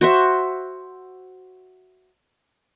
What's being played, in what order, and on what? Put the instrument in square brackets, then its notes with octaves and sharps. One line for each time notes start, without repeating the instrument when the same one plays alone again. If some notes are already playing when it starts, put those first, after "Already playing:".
[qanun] F#4 C5 E5